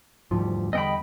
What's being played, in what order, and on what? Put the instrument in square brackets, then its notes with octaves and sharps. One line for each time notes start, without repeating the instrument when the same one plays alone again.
[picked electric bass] E1 D2 F3 [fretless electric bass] G#2 E3 G3
[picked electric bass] E2 B3 [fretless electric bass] D3 G3 [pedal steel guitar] D#5 G5 B5